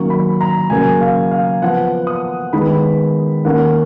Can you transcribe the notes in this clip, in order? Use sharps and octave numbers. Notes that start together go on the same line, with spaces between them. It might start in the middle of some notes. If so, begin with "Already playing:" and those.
Already playing: D#3 F#3 A#3 C#4 C#6
B5
A#5
C#3 F#3 A#3 C#4 G#5
F5
F5
F3 B3 F#5
D#6
D#3 G#3 B3 B5
D#3 A#3 C#4 F#5